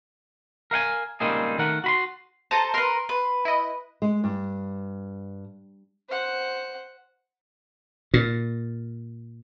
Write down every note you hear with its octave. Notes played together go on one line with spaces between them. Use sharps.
A#4 F5 F#5 G#5
C#2 G3 A#3 C4 D#4 G#4
D#3 A3 A#4 F#5
F#4 B5 C6
A4 C5 A5 A#5 D#7
A#4 B4 C6 F6
B4
E4 D#5
G#3
G2
C5 F#5
A#2